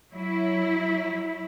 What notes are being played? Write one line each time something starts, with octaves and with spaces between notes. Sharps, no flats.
F#3 E4